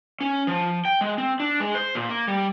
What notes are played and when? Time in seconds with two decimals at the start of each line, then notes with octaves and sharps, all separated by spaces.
0.21 C#4
0.47 F3
0.85 G5
1.01 G#3
1.18 C4
1.40 D4
1.60 G#3
1.75 C5
1.95 A#2
2.09 A#3
2.27 G3